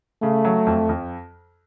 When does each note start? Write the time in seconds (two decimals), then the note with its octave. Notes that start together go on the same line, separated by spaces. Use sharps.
0.22 C#3 A3
0.45 F#3
0.67 F2
0.89 F2